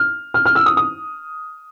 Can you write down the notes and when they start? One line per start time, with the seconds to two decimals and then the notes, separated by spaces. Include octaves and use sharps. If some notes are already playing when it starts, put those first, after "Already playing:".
Already playing: F6
0.34 F6
0.46 F6
0.55 E6
0.66 D#6
0.77 D#6